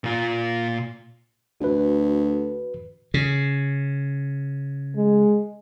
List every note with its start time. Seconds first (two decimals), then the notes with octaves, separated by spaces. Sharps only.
0.04 A#2 F4
1.61 D2 F#4 B4
3.14 C#3
4.96 G#3